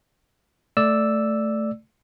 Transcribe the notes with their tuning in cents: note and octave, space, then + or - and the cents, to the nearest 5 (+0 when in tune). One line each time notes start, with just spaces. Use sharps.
A3 +0 D5 +0 E6 +0